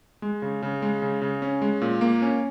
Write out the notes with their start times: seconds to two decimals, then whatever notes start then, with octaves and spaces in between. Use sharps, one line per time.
0.22 G#3
0.42 C#3
0.63 C#3
0.82 G#3
1.02 C#3
1.22 C#3
1.42 C#4
1.62 G#3
1.81 A#2
2.01 A#3
2.22 C#4